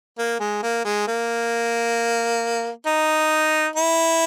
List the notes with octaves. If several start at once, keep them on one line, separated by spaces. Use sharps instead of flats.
A#3
G#3
A#3
G#3
A#3
D#4
E4